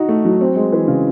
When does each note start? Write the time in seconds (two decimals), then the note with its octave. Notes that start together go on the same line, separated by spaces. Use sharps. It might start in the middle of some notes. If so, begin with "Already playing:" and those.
Already playing: D#4 F#4
0.09 A3
0.25 F#3
0.41 C4
0.56 G#3
0.72 E3
0.88 C#3